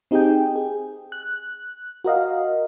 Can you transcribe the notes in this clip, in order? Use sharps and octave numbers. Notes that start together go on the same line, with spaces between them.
C4 D#4 G4 G#4 D#5 G5
G#4
F#6
F#4 A#4 D#5 F5